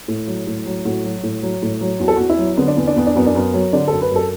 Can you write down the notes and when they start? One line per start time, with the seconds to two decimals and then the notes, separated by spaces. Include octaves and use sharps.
0.08 A2
0.27 F#3
0.47 A2
0.66 F#3
0.85 A2 F#4
1.04 F#3
1.23 A2
1.43 F#3
1.62 A2
1.81 F#3
2.00 E2 F#4
2.08 A4
2.16 E2 F#4
2.30 E4
2.39 F#3
2.57 D3 B3
2.68 D4
2.77 E2 B3
2.87 D4
2.96 E2 B3
3.07 D4
3.15 F#2 B3
3.27 D4
3.35 F#2 B3
3.54 F#3
3.73 D3 D4
3.88 F#2 A4
4.02 B4
4.11 F#2 A4